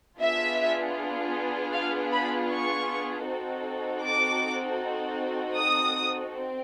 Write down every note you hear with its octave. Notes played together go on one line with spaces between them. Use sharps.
B3 D4 F4 G#4 E5
F5
B5
C#6
C4 D#4 F#4 A4
D6
D#6
C4